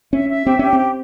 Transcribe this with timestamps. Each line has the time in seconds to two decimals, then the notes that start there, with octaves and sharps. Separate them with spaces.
0.13 C#4 E5
0.29 E5
0.46 C4 G4
0.59 C#4 G4
0.73 C4
0.79 G4